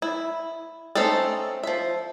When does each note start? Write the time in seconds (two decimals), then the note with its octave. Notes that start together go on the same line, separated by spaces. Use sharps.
0.02 E4
0.95 A3 C4 C#4 D#4 A4
1.63 F3 E5